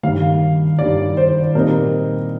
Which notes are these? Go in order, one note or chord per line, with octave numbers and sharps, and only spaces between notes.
G2 D#3 G3 F5
G2 D#3 G3 D5
C5
A#2 G3 C4 D#4 A#4